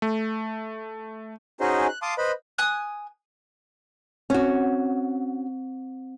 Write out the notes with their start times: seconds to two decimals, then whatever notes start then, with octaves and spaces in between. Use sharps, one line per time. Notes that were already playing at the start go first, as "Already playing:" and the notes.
0.02 A3
1.60 C#4 D#4 F#4 G#4 C5 D#5
1.88 F#6
2.02 F5 A5 C6 D6 D#6
2.18 B4 C5 D#5 B5
2.58 G#5 D#6 F#6
4.30 C4 C#4 F#4